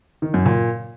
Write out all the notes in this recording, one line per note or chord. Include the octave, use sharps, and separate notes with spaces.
D#3
F#2
A#2